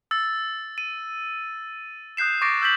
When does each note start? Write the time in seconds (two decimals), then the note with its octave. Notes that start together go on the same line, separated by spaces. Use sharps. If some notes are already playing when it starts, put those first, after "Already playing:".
0.11 E6 A6
0.78 D#7
2.17 D#6 F#6 G6 C7 E7
2.41 C#6 D6 A6 A#6 C7 D7
2.62 E6 G6 A6 B6 F#7